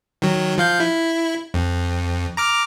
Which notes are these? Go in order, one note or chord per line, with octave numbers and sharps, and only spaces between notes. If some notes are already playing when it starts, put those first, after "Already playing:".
D#3 F#3
F3 F5 G6
E4
F2
A#5 D6 F6